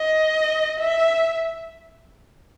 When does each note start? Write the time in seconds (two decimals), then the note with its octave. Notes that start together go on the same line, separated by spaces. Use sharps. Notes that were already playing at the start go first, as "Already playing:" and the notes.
Already playing: D#5
0.79 E5